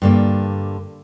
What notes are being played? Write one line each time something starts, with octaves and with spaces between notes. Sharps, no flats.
G2 D3 A#3